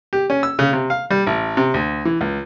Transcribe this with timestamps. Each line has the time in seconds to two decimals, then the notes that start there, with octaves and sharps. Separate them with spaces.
0.13 G4
0.30 C#4
0.43 E6
0.59 C#3
0.73 C3
0.90 F5
1.11 G3
1.27 A1
1.57 C3
1.74 D2
2.05 E3
2.21 C#2